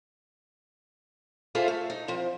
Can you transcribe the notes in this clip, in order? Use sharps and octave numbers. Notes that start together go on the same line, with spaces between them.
F4 G#4 A4 C5 E5 F5
A3
D#4
F3 C4